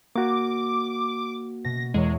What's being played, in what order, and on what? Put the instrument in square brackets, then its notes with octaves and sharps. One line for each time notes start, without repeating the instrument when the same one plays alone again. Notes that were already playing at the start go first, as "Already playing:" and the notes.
[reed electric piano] A#3 F#4 [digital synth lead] D6
[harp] B2 [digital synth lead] A#6
[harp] E2 A#4 C#5 [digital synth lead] G#3